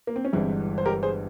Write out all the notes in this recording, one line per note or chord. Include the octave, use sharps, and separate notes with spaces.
A#3
C4
C#4
G1 G2 E3 G#3 C4 E4
C5
G4 A#4
G#4 C5